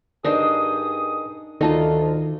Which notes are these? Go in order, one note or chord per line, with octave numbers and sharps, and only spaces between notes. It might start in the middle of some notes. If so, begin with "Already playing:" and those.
G2 D4 D#4 G#4 A#4 C5 D#5 D#6
D2 D#3 D#4 F4 A4 D#5 A5